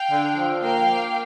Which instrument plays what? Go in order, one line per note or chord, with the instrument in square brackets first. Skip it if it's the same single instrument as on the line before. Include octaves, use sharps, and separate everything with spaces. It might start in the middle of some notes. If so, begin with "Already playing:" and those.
Already playing: [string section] F5 G5
[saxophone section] D3
F3
[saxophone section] A#3 [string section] F5 G5
[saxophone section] A#3